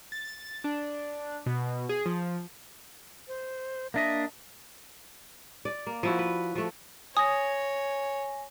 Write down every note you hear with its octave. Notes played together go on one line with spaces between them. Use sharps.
A6
D4
B2
G#4
F3
C5
A#3 D4 D#5 E5
D5
A#3
F3 E4 F#4
B4
F3 A3
C#5 G#5 D#6 A#6